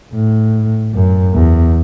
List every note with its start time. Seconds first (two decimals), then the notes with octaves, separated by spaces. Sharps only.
0.14 A2
0.94 F#2
1.35 E2